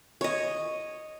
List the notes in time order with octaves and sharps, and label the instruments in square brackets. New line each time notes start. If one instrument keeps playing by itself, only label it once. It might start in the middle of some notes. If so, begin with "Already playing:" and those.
[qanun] C#5 D#5